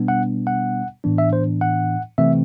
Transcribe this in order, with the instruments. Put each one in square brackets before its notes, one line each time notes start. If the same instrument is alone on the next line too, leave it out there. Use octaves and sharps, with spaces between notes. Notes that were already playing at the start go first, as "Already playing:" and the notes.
Already playing: [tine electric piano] B2 G3 B3 D4
F#5
F#5
A2 E3 B3 D4
E5
C5
F#5
C3 E3 A3 C4 E5